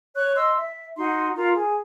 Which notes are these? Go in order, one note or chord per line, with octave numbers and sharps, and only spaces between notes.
C#5 C#6 F#6
D#5 C6 E6
E5
D#4 F#4 C6
F4 A#4 A#5
G#4